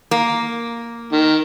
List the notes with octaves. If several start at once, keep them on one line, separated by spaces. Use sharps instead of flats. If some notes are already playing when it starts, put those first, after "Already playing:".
A#3
D#3